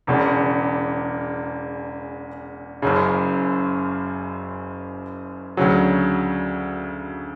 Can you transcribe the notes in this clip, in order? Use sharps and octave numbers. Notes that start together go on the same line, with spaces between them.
E1 E2 C#3
F#1 F#2 C#3
D2 C#3 F#3